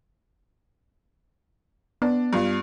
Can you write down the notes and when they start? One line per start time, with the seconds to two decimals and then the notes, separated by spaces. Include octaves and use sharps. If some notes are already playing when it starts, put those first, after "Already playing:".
2.02 B3 D4
2.33 G2 F4